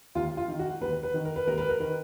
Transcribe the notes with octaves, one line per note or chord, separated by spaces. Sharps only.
D#2 F4
F4
D#3
F#4
D#2 B4
B4
D#3
A#4
B4
D#2 A#4
B4
A#4
D#3 B4